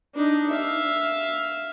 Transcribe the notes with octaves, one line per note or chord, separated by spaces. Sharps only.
D4 D#4
E5 F5